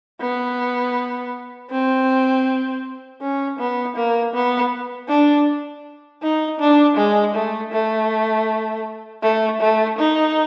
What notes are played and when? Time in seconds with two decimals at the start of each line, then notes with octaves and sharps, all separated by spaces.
0.21 B3
1.70 C4
3.21 C#4
3.59 B3
3.96 A#3
4.33 B3
5.08 D4
6.22 D#4
6.59 D4
6.97 G#3
7.34 A3
7.72 A3
9.22 A3
9.60 A3
9.98 D#4